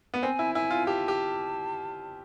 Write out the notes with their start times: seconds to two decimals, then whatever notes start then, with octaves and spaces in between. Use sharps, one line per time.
0.14 B3
0.22 C4 G#5
0.39 E4
0.55 E4 G#5
0.70 F4
0.87 G4 A5
1.08 G4